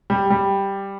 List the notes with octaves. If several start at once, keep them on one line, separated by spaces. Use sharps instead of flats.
G3
G3